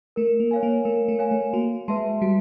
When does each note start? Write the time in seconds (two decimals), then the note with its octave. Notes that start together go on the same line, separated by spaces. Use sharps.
0.16 A3 A#4
0.40 A#3
0.51 C#5 F5 G#5
0.63 A#3
0.85 A3 A#4
1.08 A3
1.19 C#5 F5 G#5
1.31 A3
1.53 A#3 F#4
1.88 G#3 B4 E5 A5 C6
2.22 G3 F#4